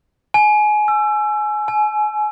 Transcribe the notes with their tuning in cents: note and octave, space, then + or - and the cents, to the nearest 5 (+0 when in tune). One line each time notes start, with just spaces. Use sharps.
G#5 +25
E6 +25
G#5 +35